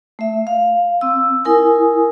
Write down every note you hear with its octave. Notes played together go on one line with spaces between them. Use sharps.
A3 E5
F5
C4 E6
E4 A#4 G#5 D#6